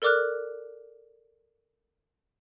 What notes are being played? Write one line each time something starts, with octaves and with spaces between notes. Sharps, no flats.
A4 A#4 D5 D6 F6 F#6